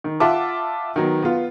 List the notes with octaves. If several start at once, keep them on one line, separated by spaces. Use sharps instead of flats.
D#3
F4 E5 F#5 A5 D6
D#3 F#3 B3
B3 F4